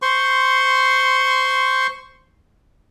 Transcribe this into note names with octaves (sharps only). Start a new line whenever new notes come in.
C5 C6 C#6